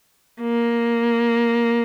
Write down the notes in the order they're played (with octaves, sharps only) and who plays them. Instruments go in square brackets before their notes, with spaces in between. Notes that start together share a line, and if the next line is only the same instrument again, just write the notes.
[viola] A#3